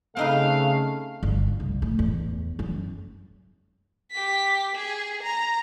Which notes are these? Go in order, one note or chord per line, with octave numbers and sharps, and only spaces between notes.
C#3 A3 C4 D#4 B4 F5
G1
C2
A2
E2
F#2
G4 B6
G#4
A#5